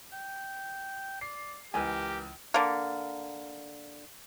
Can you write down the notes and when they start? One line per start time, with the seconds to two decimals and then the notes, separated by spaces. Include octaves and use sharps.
0.13 G5
1.21 D5 C7
1.74 C#2 E3 G4 A#4 B4 G#5
2.54 D3 A#3